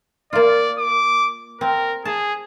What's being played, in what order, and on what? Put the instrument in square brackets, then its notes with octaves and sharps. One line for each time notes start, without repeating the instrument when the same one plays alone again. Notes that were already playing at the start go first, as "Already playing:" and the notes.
[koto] A#3 F4 [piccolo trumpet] D5
[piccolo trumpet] D6
[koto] C4 [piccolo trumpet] A#4
[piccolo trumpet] G#4 [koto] A5